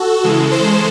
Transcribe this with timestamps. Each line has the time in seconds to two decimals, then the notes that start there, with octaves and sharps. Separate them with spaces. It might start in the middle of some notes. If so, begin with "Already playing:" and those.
Already playing: F#4 A4
0.23 C#3 E3 G#3
0.52 C5